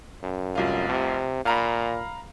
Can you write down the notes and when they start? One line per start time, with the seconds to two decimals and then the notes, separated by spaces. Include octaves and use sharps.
0.23 F#2
0.55 F1 C2 F4
0.89 C3
1.45 A#2 F5 A#5 B5